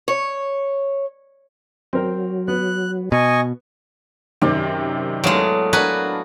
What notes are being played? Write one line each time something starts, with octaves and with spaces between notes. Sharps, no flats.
C#5
F#3 C4 A#4 G5
B3 F#6
B2 D#5 G#5 C#6
F#2 C3 D#3 C4 D5
A2 F#3 G#3 B3 F5
D4 F#4 A#4 B4 G#5